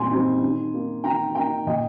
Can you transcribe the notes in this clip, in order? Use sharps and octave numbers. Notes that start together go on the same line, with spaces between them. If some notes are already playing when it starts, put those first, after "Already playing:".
Already playing: A#2 G3 C4 D#4 G#5 C6
G3 C4 D#4
D#3
A#3 D#4
D#3 G5 A#5
A#3 D#4 G5 A#5
A#2 D#5 G5